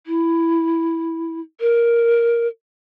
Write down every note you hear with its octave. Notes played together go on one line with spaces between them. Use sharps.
E4
A#4